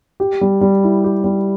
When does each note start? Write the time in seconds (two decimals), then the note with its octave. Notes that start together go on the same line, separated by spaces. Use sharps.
0.20 G4
0.41 G3
0.61 G3
0.83 E4
1.04 G4
1.24 G3